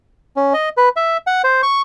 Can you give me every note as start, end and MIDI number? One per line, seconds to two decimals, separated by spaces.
0.36 0.53 61
0.54 0.69 75
0.77 0.89 71
0.96 1.17 76
1.27 1.42 78
1.44 1.62 72
1.63 1.82 85